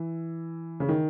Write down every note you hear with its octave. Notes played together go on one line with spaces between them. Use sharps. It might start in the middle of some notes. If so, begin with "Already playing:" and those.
Already playing: E3
C#3
D#3